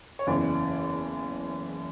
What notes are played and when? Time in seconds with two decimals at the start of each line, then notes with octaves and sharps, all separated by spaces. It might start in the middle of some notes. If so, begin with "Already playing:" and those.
0.19 C#5
0.26 F#1 E2 C#3 E3 D5